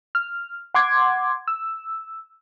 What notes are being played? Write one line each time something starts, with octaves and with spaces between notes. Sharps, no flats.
F6
F#5 C6 D6 G#6
E6